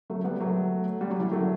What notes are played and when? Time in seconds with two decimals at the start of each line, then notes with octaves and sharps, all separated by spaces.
0.10 F#3 A3
0.24 G3 B3
0.40 F#3 A3
1.01 G3
1.10 F#3
1.19 E3 G3
1.31 F#3 A3